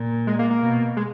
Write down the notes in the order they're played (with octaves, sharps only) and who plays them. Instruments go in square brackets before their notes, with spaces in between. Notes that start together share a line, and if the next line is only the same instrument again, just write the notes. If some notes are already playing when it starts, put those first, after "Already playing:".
Already playing: [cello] A#2
[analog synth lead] G#3
A#3
A#3
[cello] B2
[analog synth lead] G#3